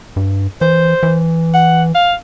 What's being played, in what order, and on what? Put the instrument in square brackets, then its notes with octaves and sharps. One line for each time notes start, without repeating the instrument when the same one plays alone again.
[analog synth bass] G2
[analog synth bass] E3 [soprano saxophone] C5
[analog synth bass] E3
[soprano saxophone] F#5
F5